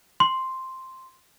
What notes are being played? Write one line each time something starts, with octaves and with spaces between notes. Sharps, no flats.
C6